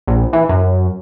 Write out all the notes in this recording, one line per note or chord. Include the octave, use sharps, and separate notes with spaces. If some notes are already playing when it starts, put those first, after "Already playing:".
A#1
E3
F#2